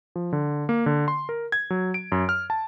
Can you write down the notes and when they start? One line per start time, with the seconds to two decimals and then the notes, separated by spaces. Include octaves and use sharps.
0.16 F3
0.33 D3
0.69 A#3
0.86 D3
1.08 C6
1.29 A#4
1.52 G#6
1.70 F#3
1.94 D7
2.12 F#2
2.29 F6
2.50 A5